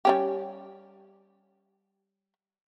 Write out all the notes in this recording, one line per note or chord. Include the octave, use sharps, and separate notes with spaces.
G3 C#4 G4